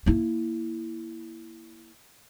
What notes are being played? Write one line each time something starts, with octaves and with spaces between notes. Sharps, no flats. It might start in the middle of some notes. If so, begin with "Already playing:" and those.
A#3 E4